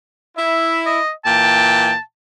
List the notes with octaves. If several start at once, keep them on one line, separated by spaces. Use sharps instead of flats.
E4 E5
D#5
A#2 E3 G5 A5